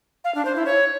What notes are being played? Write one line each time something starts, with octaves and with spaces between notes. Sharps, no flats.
F5
D4
C5
E4
C#5